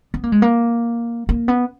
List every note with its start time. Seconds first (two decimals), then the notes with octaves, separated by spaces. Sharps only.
0.14 B3
0.23 A#3
0.32 G#3
0.42 A#3
1.29 A#3
1.48 B3